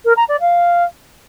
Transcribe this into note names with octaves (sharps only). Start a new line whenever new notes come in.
A#4
A#5
D5
F5